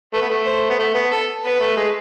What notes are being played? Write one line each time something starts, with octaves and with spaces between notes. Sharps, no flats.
A3 B4
B3
A3
C5
B3
A3
B3
A4
B3 B4
A3
G#3